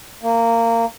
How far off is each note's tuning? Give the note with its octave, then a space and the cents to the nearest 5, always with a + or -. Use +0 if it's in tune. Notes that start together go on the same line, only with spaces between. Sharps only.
A#3 -20